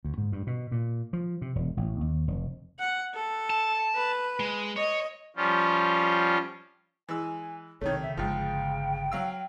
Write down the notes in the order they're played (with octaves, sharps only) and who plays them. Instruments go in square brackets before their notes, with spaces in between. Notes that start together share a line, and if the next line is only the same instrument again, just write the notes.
[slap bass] D2
G#2
G2
B2
A#2
F3
C3
E1
A1
D#2
F1
[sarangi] F#5
A4
[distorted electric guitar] A5
[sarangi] B4
[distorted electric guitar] G#3
[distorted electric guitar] C#5 [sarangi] D#5
[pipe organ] F3 G3 C#4 F4
[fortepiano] E3 G#3 E6 [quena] G#5
[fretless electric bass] B1 C3 [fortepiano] D#3 A3 [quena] C#5
[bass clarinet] C#3 [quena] E5
[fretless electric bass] G1 [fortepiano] G#2 F3 [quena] G5
[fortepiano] F#3 F5 E6